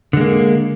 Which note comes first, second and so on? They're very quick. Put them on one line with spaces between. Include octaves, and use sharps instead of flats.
D3 G#3 A#3